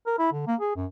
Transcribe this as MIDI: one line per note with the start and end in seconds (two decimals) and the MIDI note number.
0.07 0.14 70
0.18 0.32 64
0.33 0.47 50
0.47 0.55 58
0.60 0.72 68
0.76 0.86 42